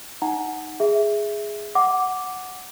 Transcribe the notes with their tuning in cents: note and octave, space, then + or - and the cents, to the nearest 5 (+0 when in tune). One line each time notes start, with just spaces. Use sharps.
D#4 +0 F#5 +0 A#5 +0
G#4 +0 E5 +0
F#5 +0 D6 -5